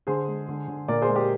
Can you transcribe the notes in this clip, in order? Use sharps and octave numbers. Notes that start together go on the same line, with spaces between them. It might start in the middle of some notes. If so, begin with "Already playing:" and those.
D3 G#4 C5
G#3
D3
D3
A#2 A#4 D5
G#4 C5
G#3
G4 A#4